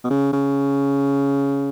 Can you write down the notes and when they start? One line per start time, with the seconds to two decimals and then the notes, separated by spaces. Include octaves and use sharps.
0.04 B2
0.10 C#3
0.33 C#3